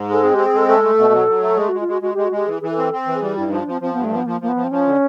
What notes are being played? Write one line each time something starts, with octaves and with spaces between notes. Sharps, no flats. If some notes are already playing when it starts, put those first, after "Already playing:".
Already playing: G#2
G#3 A4
C4 G#4
C4 G4
G#4
G#3 A4
A3 A4
A3
B2
F#3
F#3
A3
G#3 G#4
G#3 F#4
F4
G#3 F#4
G#3 F#4
G#3 G4
F#4
G#3 G4
E3 G#4
E3 G#4
A4
C4
C4
E3
G#4
G3
G2 E4
F3 D#4
D4
F3 C4
F3 C4
G2 B3
A3
F3 B3
F3 A#3
F3 A#3
B3
F3
C4
F3 C#4
D3